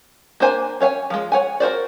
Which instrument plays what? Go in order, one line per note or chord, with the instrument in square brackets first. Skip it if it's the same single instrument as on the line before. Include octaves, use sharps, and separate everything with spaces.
[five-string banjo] A#3 D4 C5 G#5
C#4 C#5 F5 G#5
F3 G#3
C#5 F#5 G#5
F#4 A#4 C5 D5